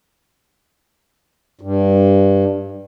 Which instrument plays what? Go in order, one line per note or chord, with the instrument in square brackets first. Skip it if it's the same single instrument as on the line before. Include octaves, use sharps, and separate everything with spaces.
[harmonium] G2